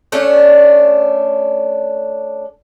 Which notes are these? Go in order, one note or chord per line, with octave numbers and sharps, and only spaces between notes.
A3 C#4 D4